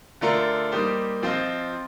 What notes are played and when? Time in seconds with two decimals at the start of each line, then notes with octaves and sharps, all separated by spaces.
0.21 D3 A3 D4 F4 A#4
0.72 G3 A#3 D#4 G4 C5
1.23 F3 C4 F4 C5 D#5